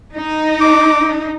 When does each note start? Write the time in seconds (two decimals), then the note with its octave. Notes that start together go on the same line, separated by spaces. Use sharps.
0.16 D#4
0.61 D6